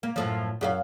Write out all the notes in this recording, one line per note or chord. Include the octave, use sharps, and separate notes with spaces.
A#3
F#2 A2 F3
F#2 G4 F5